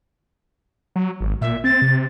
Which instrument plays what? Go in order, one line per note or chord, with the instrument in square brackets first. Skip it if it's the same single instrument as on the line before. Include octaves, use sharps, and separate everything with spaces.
[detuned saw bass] F#3
G#1
[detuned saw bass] A#2 [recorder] E5
[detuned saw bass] C4 [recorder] A6
[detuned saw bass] C3